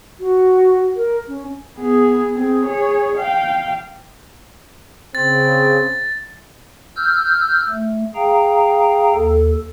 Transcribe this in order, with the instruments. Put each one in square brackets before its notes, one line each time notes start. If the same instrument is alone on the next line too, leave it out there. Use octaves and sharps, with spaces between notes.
[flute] F#4
A#4
C#4
[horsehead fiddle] B3 G#4
C4 G#4
G#4 C#5
F5 G5
[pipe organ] C#3 [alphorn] C4 [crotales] A6
[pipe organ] E6 F6 G6
A3
G#4 F5 G5 A#5
D#2 A4